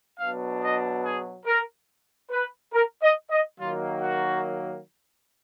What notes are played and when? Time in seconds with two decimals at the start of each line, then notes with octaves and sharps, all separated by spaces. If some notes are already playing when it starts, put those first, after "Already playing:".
0.18 B2 F#3 B3 D4 F5
0.61 D#5
1.04 G#4
1.46 A#4
2.31 B4
2.74 A#4
3.02 D#5
3.30 D#5
3.58 D#3 F#3 A#3 F4
4.01 F#4